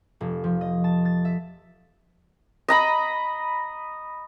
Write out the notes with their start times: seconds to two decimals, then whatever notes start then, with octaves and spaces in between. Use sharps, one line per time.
0.21 F1
0.44 F3
0.61 D#5
0.84 A5
1.05 A6
1.25 E5
2.68 D#5 A#5 B5